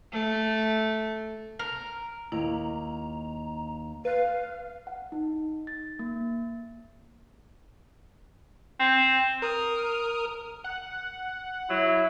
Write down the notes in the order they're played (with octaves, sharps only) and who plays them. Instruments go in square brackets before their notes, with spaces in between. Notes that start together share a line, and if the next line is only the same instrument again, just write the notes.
[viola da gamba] A3
[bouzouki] A#4
[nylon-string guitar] D#2 [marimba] E4 [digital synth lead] A#5
[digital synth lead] B4 [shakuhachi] F5
[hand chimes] F#5
D#4
A6
A#3
[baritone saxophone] C4
[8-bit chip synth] A#4 D#6 F6
[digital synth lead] F#5
[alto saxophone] F#3 [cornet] E4